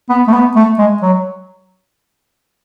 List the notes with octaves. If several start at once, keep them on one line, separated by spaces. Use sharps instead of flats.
B3
A3
B3
A3
G#3
F#3